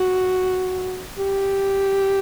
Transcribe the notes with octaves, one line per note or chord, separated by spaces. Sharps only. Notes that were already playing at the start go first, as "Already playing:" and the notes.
Already playing: F#4
G4